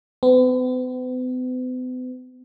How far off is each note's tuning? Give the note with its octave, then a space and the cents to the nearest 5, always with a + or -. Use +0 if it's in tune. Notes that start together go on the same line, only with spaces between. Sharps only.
B3 +45